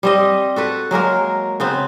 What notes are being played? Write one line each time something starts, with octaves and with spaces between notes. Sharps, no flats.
G3 C4 D#5
F#4 A4 B4
F#3 G#3 A#3 A#4
C#3 B3 C4